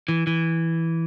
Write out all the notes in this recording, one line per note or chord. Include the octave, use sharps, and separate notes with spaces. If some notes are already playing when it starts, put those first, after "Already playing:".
E3
E3